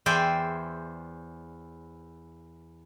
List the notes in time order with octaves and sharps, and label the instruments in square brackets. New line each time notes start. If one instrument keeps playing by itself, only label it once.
[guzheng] E2 C5 D5 E5 G5 G#5